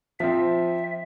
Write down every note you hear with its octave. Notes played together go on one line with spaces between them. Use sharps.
F3 C4 E5